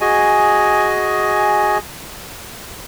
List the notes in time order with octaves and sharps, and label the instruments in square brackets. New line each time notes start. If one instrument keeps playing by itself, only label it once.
[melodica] F#4 G#4 D#5 G#5